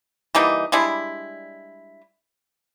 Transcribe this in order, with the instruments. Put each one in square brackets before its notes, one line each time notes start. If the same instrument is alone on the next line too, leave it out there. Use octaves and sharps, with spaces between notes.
[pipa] E3 G3 A#3 D#4
G3 G#3 D4 E4